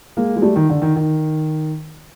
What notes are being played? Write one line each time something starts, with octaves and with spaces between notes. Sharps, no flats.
G#3 A#3
G#3
G3 A3
D#3
D3
D#3
D#3